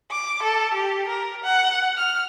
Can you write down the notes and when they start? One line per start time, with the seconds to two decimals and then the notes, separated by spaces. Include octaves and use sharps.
0.11 D6
0.43 A4
0.74 G4
1.08 A#4
1.44 F#5
1.97 F6